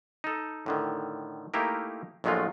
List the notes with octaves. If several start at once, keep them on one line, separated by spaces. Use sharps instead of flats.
D#4 A4
A2 D3 D#3
A3 A#3 D#4 E4 G4 A#4
A#1 A2 F#3 G#3 A3 F4